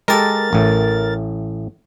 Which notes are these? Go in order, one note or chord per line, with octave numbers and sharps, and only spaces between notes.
G#3 G4 A4 A#4 A6
A1 A2